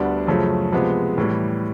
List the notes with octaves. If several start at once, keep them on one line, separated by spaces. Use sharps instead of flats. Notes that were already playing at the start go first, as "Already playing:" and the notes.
Already playing: D2 D3 G3 B3 D4
F#2 C#3 F3 A3
C3 F3 G#3 B3
A2 E3 G3